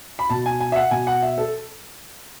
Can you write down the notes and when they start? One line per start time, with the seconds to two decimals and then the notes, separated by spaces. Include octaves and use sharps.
0.19 B5
0.30 B2 A5
0.46 G#5
0.61 G#5
0.72 E5
0.76 F#5
0.91 B2 G#5
1.07 F#5
1.23 E5
1.38 A4